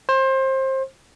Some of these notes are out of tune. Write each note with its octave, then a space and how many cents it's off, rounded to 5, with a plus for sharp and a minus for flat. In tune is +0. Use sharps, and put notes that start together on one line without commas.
C5 +25